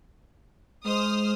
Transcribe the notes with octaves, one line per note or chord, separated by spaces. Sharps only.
G#3 C5 D#6 F6